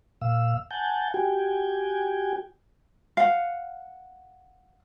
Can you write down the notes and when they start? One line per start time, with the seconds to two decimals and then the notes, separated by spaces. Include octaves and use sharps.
0.21 A#2 F5 E6
0.71 F#5 G#5 A5 G6
1.14 F#4 G4 G5 G#5
3.17 F5 F#5